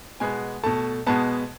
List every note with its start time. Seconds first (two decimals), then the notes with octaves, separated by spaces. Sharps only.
0.20 B2 G#3 B3 G#5
0.64 B2 A3 A5
1.07 B2 G#3 B3 A5